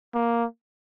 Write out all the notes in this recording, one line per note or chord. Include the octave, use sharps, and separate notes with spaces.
A#3